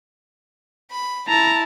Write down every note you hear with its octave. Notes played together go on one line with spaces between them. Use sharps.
B5
E4 A5 A#5